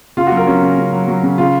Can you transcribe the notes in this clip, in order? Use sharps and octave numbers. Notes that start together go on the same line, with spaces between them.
C#3 F4
F#4
F#3
A#4
F#3 C#4
C#3
C#3
F#3
F#3
C#3
C#3 F4